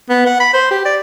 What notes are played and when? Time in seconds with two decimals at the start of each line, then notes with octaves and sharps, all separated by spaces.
0.09 B3
0.26 F#5
0.40 B5
0.53 C5
0.71 G4
0.85 D5